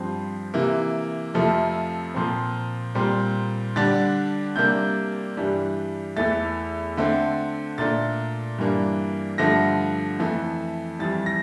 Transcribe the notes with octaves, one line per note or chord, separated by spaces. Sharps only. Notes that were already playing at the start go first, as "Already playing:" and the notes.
Already playing: G2 F3 C4
C3 E3 A#3
F2 C3 F3 A3
A#2 F3 C4
A#2 G3 C4
D3 G3 D4 A6
C3 G3 A#3 D4 G6
G2 E3 G3 D4
E2 E3 A3 A6
D3 A3 C4
A#2 A3 D4 A6
G2 E3 A#3 D4
G2 D3 F3 A3 A#6
F2 E3 A3
F2 E3 G3 A6
A#6